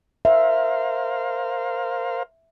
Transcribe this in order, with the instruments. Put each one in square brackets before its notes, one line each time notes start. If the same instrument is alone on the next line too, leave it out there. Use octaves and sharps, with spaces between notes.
[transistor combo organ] A#4 C5 F5 [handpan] E5